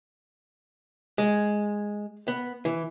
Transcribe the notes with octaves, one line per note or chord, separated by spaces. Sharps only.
G#3
B3
E3